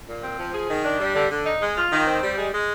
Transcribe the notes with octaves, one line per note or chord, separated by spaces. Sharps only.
A#2
C4
F3
G#4
D#3
D4
G3
D3
D3
D#4
G#3
F4
D#3
C4
G3
G#3
G#3